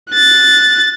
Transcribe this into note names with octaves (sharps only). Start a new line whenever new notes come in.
F#6 A6